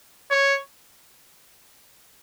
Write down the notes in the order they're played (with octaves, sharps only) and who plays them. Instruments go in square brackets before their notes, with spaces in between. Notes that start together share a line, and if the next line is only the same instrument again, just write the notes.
[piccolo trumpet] C#5